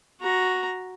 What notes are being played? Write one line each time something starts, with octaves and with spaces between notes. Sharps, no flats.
F#4 A#5